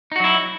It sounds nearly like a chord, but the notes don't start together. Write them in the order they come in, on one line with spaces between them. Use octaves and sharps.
D#4 F#4 F#3 E4